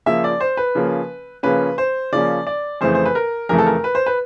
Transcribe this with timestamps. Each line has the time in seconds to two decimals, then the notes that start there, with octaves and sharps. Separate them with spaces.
0.06 C#3 F3 A#3 C#4 E5
0.24 D5
0.41 C5
0.57 B4
0.75 C#3 F3 A#3 C#4
1.43 C#3 F3 A#3 C#4 B4
1.78 C5
2.12 C#3 F3 A#3 C#4 D5
2.47 D5
2.81 F2 C#3 E3 A3 C5
2.95 C5
3.06 B4
3.15 A#4
3.49 F2 C#3 E3 A3 A#4
3.58 A4
3.67 A#4
3.84 B4
3.95 C5
4.06 B4